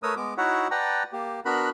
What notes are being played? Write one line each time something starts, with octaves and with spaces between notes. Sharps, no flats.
A3 A#4 B4 C#5 D#6 E6
G#3 B3 D6
D#4 E4 F#4 C#5 E5 F#5
B4 D5 F#5 G5 A5 A#5
A#3 G4
B3 D4 F#4 A#4 B5 F#6